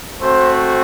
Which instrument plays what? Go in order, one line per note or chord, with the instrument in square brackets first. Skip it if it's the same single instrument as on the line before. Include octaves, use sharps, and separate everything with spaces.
[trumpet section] A3 C4 F#4 C5